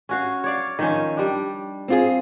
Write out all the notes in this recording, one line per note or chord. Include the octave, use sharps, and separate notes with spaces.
C#4 F#4 F5
C#5 D5 F5
D#3 F3 C#4
G3 D4
C4 F4 G#4